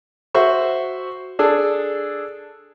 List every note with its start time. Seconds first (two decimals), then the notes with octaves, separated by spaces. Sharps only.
0.35 F#4 C5 E5 C#6
1.39 D4 G#4 A4